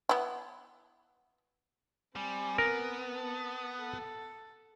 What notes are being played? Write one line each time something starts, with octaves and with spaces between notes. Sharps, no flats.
B3 E4
G3 C4 G#5
B3 A#4
A5
A4